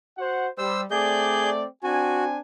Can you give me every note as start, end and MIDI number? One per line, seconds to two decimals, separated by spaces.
0.18 0.47 66
0.18 0.47 72
0.18 0.47 78
0.58 0.84 55
0.58 0.81 72
0.58 0.81 88
0.91 1.65 57
0.91 1.65 60
0.91 1.50 68
0.91 1.65 74
0.91 1.50 91
1.84 2.38 60
1.84 2.38 62
1.84 2.24 66
1.84 2.38 80